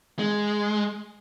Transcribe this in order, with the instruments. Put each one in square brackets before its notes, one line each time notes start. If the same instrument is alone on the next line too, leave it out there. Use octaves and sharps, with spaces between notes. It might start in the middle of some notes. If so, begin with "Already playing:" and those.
[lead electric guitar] G#3